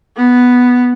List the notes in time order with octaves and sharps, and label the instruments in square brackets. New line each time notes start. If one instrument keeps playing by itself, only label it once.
[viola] B3